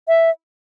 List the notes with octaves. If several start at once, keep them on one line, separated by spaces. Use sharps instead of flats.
E5